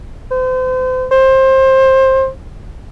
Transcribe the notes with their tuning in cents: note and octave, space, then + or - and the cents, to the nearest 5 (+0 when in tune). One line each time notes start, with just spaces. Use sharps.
C5 -35
C5 +20